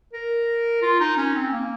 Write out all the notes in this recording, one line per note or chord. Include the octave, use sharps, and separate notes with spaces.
A#4
F4
D#4
C#4
C4
A#3